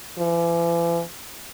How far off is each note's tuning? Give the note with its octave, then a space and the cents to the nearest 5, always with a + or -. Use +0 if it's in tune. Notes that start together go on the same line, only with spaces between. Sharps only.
E3 +40